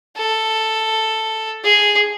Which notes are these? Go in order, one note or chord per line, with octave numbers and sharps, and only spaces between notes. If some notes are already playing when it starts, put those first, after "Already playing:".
A4
G#4